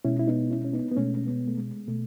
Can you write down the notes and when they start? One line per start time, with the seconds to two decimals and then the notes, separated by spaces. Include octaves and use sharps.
0.05 B2 G#3 C#4 E4
0.19 E4
0.28 B3 D#4
0.51 C#4 E4
0.65 C#4
0.73 B3 D#4
0.91 B3
0.96 B2 G#3 A3 C#4
1.17 C#4
1.27 G#3 B3
1.47 A3
1.58 G#3
1.88 B2 A3